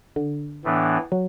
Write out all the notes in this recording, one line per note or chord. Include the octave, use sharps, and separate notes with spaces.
D3
A2 E3 B3 D4
F#3